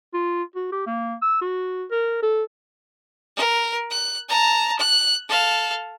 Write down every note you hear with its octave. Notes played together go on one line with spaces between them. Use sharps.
F4
F#4
G4
A#3
E6
F#4
A#4
A4
A#4
F#6
A5 A#5
F#6
A4 F5